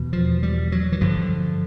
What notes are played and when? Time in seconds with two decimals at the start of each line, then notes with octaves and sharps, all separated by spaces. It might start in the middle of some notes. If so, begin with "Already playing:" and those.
Already playing: E2 B2
0.13 F3
0.43 G3
0.72 F#3
0.92 E3
1.01 G2 D3 F3